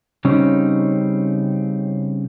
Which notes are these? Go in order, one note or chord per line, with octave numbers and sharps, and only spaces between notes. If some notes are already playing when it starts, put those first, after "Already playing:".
C#3 G3 C4 C#4 D#4